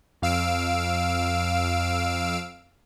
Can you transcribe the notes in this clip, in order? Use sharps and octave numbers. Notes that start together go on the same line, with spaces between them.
F2 F5 E6 D7